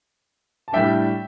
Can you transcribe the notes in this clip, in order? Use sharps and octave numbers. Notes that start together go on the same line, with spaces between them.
A5
A2 G3 D4 E5 G5